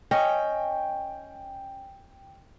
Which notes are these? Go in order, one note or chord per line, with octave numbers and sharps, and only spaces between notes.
C#4 C#5 D#5 G5